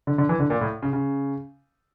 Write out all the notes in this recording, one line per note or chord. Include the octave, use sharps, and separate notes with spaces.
D3
D3
E3
D3
A#2
A2
C#3
C#3